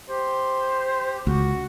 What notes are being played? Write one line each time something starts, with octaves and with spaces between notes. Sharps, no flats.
G4 C5
C#2 F#4